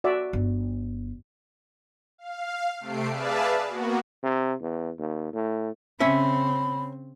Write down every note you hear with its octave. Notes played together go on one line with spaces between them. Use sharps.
F#4 D5 E5
G1
F5
C3 A3 C7 D7
G#4 B4 D5 E5 F5 A5
A#3 B3 F#4
C3
E2
D#2
A2
C#3 C4 C#4 E5 B5